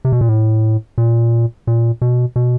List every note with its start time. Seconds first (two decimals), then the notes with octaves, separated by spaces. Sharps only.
0.05 C3
0.13 B2
0.21 A#2
0.29 A2
0.98 A#2
1.67 A#2
2.02 B2
2.36 B2